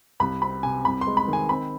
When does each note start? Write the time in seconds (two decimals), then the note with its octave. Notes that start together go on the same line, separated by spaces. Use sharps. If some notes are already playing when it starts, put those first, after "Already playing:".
0.20 C2 B5
0.42 C4 B5
0.63 C3 G#5
0.85 C2 B5
1.01 C6
1.07 G#3
1.17 B5
1.28 D#3 G#5
1.49 C4 B5